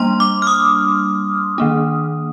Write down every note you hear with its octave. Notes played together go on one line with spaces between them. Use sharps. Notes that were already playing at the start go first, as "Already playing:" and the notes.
Already playing: G3 A#3 D4 C6
D6
F6
D#6
D#3 A#3 D4